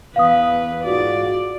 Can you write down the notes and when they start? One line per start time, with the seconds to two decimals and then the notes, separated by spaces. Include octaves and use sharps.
0.16 E2 B4 F5 D#6
0.85 G#2 F4 F#4 D5